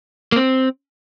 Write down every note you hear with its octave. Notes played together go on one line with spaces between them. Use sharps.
A#3
C4